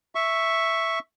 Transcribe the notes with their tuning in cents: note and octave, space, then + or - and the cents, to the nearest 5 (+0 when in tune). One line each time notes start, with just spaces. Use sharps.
E5 +0 C#6 +0